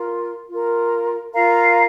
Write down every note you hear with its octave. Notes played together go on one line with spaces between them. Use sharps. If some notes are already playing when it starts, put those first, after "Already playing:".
Already playing: F4 A#4
F4 A#4
F4 A#4 F5 A#5